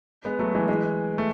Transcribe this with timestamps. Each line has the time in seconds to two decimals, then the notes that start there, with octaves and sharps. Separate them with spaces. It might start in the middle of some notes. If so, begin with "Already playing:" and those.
0.25 G#3 B3
0.39 F#3 A3
0.55 E3 G#3
0.68 E3 G#3
1.18 A3